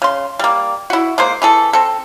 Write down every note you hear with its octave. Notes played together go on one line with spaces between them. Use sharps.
C#3 C6
G3 A#3
E4 F#4
G#3 A#3 C5
E3 G#4 A4
C4 A4